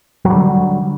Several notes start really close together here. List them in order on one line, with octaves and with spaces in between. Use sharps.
F#3 G3 D3